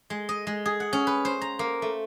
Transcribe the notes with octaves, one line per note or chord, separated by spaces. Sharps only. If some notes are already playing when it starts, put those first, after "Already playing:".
G#3
D#5
G#3
G#4
F#5
C#4
B4
C5
A#5
A#3
A3